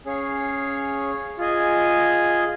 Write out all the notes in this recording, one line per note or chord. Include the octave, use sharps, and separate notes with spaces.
C#4 G#4 C#5 F5
F4 G#4 D#5 G#5